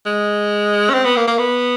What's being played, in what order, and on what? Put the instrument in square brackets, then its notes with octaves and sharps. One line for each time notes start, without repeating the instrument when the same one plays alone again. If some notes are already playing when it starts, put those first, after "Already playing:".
[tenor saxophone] G#3
C#4
C4
B3
A#3
A#3
B3